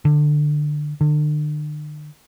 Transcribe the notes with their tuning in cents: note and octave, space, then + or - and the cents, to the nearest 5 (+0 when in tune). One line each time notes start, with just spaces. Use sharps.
D3 +20
D3 +40